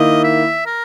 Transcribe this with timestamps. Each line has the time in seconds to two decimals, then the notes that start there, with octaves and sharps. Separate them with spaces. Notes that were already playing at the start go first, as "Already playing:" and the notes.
Already playing: D#3 A#3 E4 D#5
0.24 E5
0.66 A#4